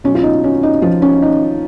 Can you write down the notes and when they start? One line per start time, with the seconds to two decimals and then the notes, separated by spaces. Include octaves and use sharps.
0.04 B2 F#3 C#4
0.15 F4
0.23 D#4
0.44 C#4
0.63 D#4
0.82 F3 F4
1.02 C#4
1.22 D#4